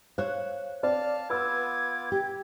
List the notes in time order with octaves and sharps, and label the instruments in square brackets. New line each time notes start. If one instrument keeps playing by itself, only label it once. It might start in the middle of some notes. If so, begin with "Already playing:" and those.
[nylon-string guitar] C5 C#5 [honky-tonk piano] F5 F#6
[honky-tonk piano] C4 D5 [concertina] F5 A5 F6
[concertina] B3 F4 D6 [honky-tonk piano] B4 E6 [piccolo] G#6
[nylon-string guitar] G4